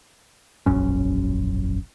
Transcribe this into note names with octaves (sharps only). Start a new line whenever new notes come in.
E1 A#1 F#2 C#4